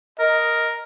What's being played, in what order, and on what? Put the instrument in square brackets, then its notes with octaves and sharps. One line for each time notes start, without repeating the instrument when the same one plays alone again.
[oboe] A#4 [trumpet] D#5